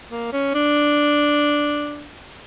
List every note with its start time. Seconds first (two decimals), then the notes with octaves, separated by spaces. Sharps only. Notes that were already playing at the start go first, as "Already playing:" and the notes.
0.12 A#3
0.33 C#4
0.54 D4